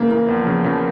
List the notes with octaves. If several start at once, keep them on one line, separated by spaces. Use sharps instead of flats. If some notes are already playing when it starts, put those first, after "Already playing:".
Already playing: C#3 E3 A#3
A#3
E2 F3
C#3
C#3